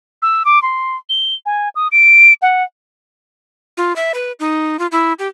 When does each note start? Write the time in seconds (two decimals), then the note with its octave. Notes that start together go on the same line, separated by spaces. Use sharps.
0.22 E6
0.45 D6
0.62 C6
1.09 G7
1.46 G#5
1.75 D#6
1.92 D7
2.42 F#5
3.77 F4
3.96 E5
4.14 B4
4.40 D#4
4.79 F4
4.92 E4
5.19 G4